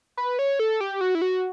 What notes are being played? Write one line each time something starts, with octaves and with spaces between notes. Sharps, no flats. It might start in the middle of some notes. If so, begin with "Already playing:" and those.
B4
C#5
A4
G4
F#4
E4
F#4